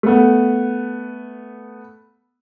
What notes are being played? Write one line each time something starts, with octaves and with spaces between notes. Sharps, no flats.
A3 B3